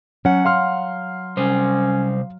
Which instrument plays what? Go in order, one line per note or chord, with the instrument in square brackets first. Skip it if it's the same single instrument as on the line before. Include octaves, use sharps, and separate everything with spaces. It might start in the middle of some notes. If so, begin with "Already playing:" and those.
[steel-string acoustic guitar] F#3 F#5 [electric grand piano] C#4
[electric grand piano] F5 C6 F6
[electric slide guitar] C3 G3 C5 [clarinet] C#4